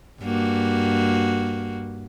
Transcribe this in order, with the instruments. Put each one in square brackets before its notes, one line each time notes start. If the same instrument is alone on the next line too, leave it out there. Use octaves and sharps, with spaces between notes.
[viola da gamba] G2 A#3 F#4